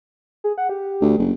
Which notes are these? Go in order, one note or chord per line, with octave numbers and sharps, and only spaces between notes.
G#4
F#5
G4
D2
F#1